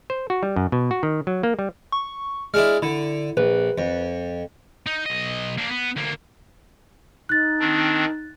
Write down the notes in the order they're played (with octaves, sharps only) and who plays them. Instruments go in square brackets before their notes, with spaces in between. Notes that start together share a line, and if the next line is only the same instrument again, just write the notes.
[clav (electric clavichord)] C5
F#4
G3
F#2
B2
F#4
D#3
F#3
A#3
G3
[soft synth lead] C#6
[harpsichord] G#3 D4 E4 [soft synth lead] F6
[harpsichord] D3 [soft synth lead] E4
[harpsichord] A#1 [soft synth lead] B4
[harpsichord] F2
[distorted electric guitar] D#4
B1 D#5
A#3 D4
B3
D2 A#3
[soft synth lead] D#4 [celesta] F#6 A6
[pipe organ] D#3 C4 D4